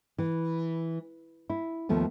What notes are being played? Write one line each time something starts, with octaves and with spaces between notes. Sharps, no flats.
E3
E4
D#2 F3 A3 B3